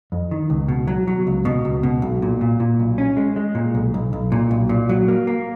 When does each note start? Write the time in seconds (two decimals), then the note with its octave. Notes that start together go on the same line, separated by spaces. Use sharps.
0.12 F2
0.31 D#3
0.50 C#2
0.68 B2
0.87 F#3
1.07 F#3
1.27 C#2
1.45 B2
1.65 C#2
1.83 B2
2.02 B1
2.22 A#2
2.41 A#2
2.60 A#2
2.80 B1
2.98 C#4
3.17 G#3
3.36 G#3
3.55 A#2
3.75 B1
3.94 B1
4.13 B1
4.32 A#2
4.51 B1
4.69 A#2
4.89 F#3
5.08 A#3
5.27 A#3